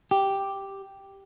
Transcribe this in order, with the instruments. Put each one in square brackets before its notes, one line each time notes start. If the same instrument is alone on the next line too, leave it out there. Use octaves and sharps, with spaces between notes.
[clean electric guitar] G4